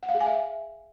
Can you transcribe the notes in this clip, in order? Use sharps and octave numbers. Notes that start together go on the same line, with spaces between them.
F#5
F5
G#4
G#5
E5